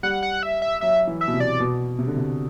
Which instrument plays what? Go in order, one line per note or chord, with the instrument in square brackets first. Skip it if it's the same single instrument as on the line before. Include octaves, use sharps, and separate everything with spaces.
[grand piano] G3 [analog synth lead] F#5
[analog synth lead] F#5
E5
E5
[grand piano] F#3 [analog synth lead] E5
[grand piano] E3
[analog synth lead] E5
[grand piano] B2
C3
[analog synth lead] D5
[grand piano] B2
C3
D3
C3